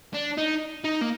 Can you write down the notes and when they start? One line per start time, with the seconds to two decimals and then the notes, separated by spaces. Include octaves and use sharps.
0.14 D4
0.37 D#4
0.84 D#4
1.01 A#3